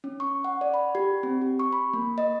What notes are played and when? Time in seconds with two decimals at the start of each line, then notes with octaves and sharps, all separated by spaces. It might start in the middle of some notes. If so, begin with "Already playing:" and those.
0.04 C#4
0.20 C#6
0.44 F#5
0.61 D5
0.74 B5
0.95 G4
1.23 C4
1.42 G4
1.59 C#6
1.73 B5
1.93 A#3
2.18 D#5